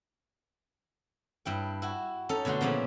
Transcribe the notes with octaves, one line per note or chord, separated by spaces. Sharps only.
G2 E4 G5
E4 F#4
C#4 D#4 A4
B2 D3 A3 F#4 C6
A#2 C#3 F3 B3 E4